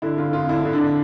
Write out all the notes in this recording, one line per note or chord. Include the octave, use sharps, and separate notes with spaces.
D3 E4
D3 F4
F2 F4
D3 E4
D3
D4
D3